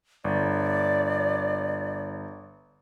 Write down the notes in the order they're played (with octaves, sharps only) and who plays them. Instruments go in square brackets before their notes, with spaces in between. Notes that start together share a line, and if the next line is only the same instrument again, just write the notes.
[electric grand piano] G1 [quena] D5